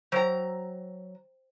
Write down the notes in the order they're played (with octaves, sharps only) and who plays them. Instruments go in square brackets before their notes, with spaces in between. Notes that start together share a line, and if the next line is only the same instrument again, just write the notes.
[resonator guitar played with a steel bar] F#3 A#5 [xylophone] C5 G5